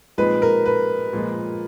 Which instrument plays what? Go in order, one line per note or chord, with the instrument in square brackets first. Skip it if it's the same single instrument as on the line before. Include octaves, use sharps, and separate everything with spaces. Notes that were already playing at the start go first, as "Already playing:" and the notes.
[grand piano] A#2 F3 G#3 C4 D#4 [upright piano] B4
[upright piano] A#4
B4
[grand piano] A#2 F3 G#3